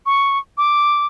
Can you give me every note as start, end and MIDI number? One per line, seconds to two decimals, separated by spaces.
0.06 0.38 85
0.58 1.06 86